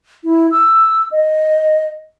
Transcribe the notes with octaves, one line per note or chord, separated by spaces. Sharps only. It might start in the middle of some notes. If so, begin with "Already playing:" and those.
E4
E6
D#5